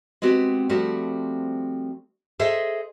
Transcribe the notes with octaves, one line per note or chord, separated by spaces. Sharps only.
G#3 B3 C4 F#4 G4
F3 G3 A3 C4 F#4
G#4 A4 C5 D#5 E5